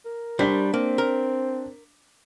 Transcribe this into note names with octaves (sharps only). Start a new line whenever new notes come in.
A#4
G3 D4 C5 B6 G7
A#3 C4
A#4